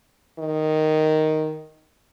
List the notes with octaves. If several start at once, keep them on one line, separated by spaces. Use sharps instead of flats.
D#3